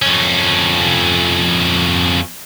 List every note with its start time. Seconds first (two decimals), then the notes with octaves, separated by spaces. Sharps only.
0.02 F2 C#4